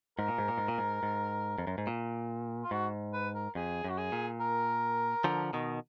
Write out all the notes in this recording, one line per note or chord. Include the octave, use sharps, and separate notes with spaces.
G#2 A#4
A#2
G#2
A#2
G#2
A#2
G#2
G#2
F2
F#2
G#2
A#2
F4
G#2 F#4
B4
A#4
F2 G#4
F#2 F#4
G#4
A#2
A#4
D3 F3
B2 D#3